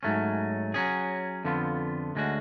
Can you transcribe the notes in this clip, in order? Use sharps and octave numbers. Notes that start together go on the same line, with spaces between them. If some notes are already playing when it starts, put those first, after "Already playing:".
G#2 F#3 A3 C#4
F#3 C#4 G#4
F2 D3 F3 B3 F4
D2 D3 G#3 C#4 F#4